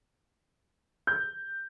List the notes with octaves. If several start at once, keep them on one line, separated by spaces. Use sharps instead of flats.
G6